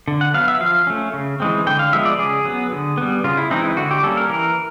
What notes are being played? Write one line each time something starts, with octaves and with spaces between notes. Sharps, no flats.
D3
F#5
F#3 B3 F5
E5
F3 F5
A3 C#4
C#3
E3 G#3 C4
D3 G5
F5
F3 G#3 B3 E5
D5
C#3 G#4
F#3 B3
D3
G3 B3
C#3 F4
E4
E3 G#3 C4 D#4
E4
D3 F#4
G4
G3 A#3 C#4 A4
A#4
E3 A#4